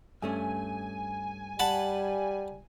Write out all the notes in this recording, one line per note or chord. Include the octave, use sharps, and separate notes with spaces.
G2 A3 C#4 G#5
G3 F#5 A5 B5